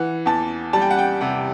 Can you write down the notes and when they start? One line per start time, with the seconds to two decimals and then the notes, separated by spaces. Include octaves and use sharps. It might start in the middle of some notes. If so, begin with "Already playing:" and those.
Already playing: E3 F#5
0.26 E2 A5
0.73 G3 A5
0.82 G5
0.91 F#5
0.99 G5
1.21 C3 F#5